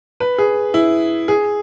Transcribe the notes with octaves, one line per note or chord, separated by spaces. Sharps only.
B4
G#4
E4
G#4